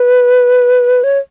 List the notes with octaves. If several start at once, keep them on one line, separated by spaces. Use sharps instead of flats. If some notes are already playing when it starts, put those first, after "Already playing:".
Already playing: B4
C#5